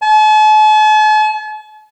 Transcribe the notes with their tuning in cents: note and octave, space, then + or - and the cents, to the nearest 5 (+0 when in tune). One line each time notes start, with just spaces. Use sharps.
A5 -45